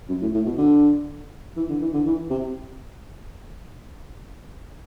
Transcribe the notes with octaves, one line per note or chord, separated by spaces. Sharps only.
F#2
A2
A2
B2
D3
E3
D3
E3
D3
E3
C3